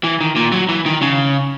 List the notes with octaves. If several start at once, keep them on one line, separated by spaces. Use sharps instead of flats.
E3
D#3
A#2
F#3
E3
D#3
C#3